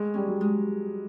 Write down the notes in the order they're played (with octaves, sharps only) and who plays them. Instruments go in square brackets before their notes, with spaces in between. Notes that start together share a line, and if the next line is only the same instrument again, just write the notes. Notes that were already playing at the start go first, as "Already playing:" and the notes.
Already playing: [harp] A2 [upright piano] G#3
[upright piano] G3 [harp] C#4
[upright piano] F#3
[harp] G#3